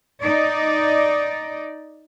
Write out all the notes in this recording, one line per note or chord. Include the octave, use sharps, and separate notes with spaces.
D#4 D5